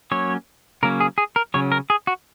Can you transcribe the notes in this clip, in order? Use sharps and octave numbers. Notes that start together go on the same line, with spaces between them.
F#3 A#3 C#4 C#5
C#3 F#3 A#3 C#4 A#4
G#4
G#4
A#4
C#3 F#3 C#4 C#5
A#4
G#4
F#4